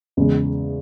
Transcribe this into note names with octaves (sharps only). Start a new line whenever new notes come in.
E2 C#3 G#3